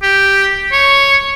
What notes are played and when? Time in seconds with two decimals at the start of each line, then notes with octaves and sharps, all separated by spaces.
0.02 G4
0.72 C#5